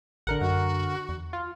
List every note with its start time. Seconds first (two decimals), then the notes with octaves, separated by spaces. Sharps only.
0.27 A1 D3 A#4 F#5
0.41 F#2 F#4
1.09 E2
1.33 F4